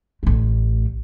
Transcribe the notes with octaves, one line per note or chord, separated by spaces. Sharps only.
A1 A3